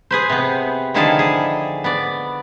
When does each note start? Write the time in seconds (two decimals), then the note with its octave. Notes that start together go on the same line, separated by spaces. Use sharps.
0.11 G#4 B4 C5
0.30 C3 B3
0.94 D3 D#3 F3 E4 G#4 A4
1.19 G#4
1.84 B3 D5